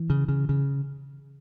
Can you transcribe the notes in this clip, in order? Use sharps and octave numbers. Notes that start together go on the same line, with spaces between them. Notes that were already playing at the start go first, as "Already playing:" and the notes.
Already playing: E3
C#3
C#3
C#3